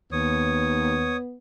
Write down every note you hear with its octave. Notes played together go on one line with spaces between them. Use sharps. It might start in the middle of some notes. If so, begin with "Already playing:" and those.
D#2 B3 C#5 D#6